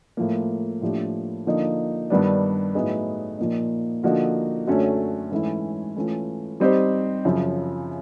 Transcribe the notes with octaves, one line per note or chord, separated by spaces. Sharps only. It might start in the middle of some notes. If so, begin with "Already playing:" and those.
A2 F3 A#3
A2 F3 A#3 D4 G4
D3 F3 A#3 D#4
G2 D#3 G3 B3 D4
A2 F#3 B3 D#4 G#4
A#2 F3 A#3 D#4
D3 F3 A#3 D#4 F#4
F#2 D3 F#3 A3 C#4
G#2 E3 A3 C#4 E4
E3 A3 C#4 F4
G3 C4 D#4 G4 C5
F#2 C#3 F3